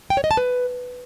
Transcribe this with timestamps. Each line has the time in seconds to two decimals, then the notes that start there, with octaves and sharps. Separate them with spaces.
0.10 G5
0.17 C#5
0.24 D#5
0.31 A5
0.37 B4